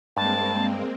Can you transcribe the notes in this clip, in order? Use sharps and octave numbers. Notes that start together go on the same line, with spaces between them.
G2 G#3 A#3 C4 A5